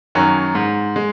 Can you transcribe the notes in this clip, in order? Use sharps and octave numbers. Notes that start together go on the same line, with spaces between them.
F#2 D#3 F#3 C#4
G#2
G#3